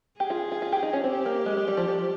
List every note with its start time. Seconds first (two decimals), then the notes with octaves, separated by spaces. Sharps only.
0.20 G4 G#4
0.30 F4
0.52 F4
0.62 F4
0.72 G4
0.83 D#4
0.93 C#4
1.04 C4 G4
1.26 A#3
1.46 G#3
1.57 G#3
1.68 G3
1.77 F3
1.88 F3